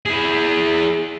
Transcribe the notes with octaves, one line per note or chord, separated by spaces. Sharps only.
E4 G#4